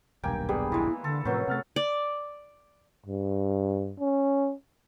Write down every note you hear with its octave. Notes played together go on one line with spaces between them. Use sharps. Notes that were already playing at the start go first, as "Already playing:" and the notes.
D#1 B1 G2 A#3 G5 G#5
G3 B3 G#4
E3 G#3 E4
D3 A4 C6
F#2 A2 C3 F3 F#3 B4 G6
C3 A3 F#5 F6 A6
D5
G2
C#4